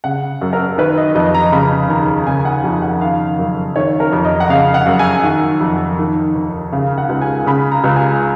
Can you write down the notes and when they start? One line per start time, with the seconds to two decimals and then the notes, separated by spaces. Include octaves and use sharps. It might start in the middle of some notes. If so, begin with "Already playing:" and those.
0.04 C#3 F#5
0.41 F#2
0.53 A#4
0.78 D#3 B4
0.97 D#5
1.15 F2 D#5
1.35 A#5
1.52 C#3 B5
1.89 D#2 A#5
2.27 C#3 G#5
2.45 F#5
2.64 F2
2.82 F#5
3.01 D#3 F5
3.39 F#2
3.76 D#3 C#5
4.00 A#4
4.13 F2
4.25 D#5
4.40 F#5
4.49 C#3 F5
4.74 F#5
4.86 F#2
4.99 G#5
5.24 D#3 F#5
5.61 F2
5.99 D#3
6.35 D#2
6.72 C#3 F5
6.98 F#5
7.09 C#2
7.22 G#5
7.46 C#3 B5
7.72 A#5
7.84 C#2
7.96 G#5